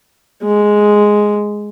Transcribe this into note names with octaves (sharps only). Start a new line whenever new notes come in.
G#3